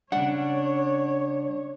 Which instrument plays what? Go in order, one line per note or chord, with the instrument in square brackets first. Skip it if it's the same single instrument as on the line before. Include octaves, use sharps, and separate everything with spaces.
[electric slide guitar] C#3 G3 [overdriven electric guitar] D4 [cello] C#5 [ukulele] F#5